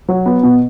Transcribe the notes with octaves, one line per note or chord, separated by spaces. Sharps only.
F#3
B3
B2